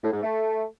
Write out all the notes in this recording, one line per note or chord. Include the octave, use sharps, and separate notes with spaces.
A2
G#2
A3